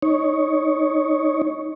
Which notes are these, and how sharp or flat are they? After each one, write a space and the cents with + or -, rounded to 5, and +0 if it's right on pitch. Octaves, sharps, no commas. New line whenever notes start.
D#4 +0 C#5 +0